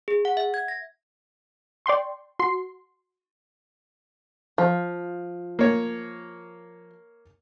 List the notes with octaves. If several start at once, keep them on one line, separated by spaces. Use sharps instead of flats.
G#4
F#5
E5
G#6
A#6
D5 G5 C6 C#6
F#4 C6 C7
F3
A#3 C#5